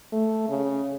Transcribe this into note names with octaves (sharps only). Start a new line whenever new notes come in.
A3
C#3